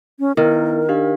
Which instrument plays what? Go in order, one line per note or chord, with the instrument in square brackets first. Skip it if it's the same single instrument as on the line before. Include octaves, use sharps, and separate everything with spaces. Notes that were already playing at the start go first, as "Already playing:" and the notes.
[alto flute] C#4
[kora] D#3 [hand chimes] B3 E4 [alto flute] A#4
[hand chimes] D4 G4 F5